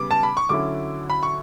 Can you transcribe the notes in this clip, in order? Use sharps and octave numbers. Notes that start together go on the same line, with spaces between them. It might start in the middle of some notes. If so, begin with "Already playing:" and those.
Already playing: C#3 G3 B3 D6
A5
B5
C#6
D3 F#3 C#4 E4 D6
B5
C#6